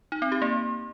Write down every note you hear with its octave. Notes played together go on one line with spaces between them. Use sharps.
D#4
C4
G4
A#3